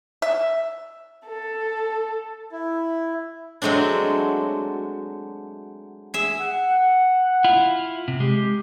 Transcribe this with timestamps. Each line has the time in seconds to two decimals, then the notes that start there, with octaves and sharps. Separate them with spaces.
0.22 E5
1.27 A4
2.52 E4
3.62 F#3 G#3 A3 C4 D4
6.14 G#4 E5
6.39 F#5
7.44 E4 F4
8.08 C3
8.20 G#3 G4